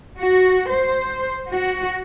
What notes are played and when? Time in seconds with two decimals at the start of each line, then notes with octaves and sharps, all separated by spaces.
0.17 F#4
0.68 C5
1.50 F#4